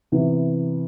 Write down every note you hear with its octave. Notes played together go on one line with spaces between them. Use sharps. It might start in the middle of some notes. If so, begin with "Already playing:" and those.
C3 E3 B3 E4